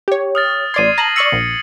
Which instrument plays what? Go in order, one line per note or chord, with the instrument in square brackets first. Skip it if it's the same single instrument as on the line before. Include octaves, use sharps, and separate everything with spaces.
[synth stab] G4 C#5
[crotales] D#6 F6 A6
[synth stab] A1 D5 C6 [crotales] G#6 C7 D#7
[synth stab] A5 A#5 [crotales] A#6 F#7
[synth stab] D5 C#6 E6 [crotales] A#6 C#7 F#7
[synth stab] A#1